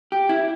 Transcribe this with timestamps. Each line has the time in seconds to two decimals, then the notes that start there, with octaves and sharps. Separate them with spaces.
0.12 G4
0.29 E4